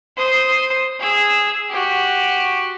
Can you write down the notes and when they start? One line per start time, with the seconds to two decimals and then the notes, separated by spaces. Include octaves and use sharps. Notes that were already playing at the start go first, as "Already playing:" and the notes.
0.17 C5 D#6
1.00 G#4 E6
1.70 F#4 G4